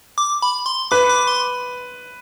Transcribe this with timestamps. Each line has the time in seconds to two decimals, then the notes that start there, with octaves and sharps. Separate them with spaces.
0.18 D6
0.42 B5
0.66 C6
0.91 B4 D6
1.09 D6
1.27 C6